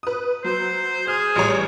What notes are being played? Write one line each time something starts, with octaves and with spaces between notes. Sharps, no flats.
B4 D#6
F#3 C5
G#4 D#6 F6
A1 G3 C#5